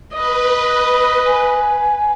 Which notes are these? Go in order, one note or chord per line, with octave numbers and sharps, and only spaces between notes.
B4 D#5
G#5